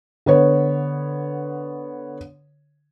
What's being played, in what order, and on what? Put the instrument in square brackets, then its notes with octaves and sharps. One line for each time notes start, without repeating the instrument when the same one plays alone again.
[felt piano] D3 B3 C#5